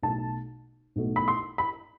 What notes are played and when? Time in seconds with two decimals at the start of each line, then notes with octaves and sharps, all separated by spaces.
0.02 B1 B2 A3 A5
0.96 B1 B2 A3
1.16 B5
1.28 C6
1.58 B5